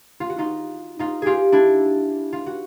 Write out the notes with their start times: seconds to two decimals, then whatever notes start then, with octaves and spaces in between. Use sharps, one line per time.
0.20 F4
0.30 F#4
0.38 D#4 F4
0.99 D#4 F4
1.22 F4 G4 G#4
1.52 D4 E4
2.33 F4
2.46 F#4